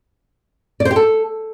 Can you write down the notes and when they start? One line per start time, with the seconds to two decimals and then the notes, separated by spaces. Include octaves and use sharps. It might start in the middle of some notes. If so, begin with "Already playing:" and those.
0.80 D5
0.85 C5
0.91 G4
0.96 A4